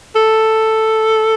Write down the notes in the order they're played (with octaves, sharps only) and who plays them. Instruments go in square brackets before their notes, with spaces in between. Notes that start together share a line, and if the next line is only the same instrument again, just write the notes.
[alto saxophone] A4